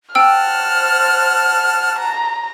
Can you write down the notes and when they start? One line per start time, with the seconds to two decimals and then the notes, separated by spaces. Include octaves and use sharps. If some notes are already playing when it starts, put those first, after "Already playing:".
0.15 C5 F#5 G5 A5 E6 F6
1.99 A#5